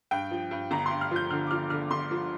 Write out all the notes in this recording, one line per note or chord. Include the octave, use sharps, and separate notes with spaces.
G2 G5
F3
G2
G1 A#5
G2 C6
F6
F3 G6
D3 F6
D6
F3 F6
D3 F6
G1 C6
F3